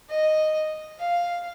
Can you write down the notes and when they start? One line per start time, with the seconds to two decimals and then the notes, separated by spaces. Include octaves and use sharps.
0.10 D#5
0.99 F5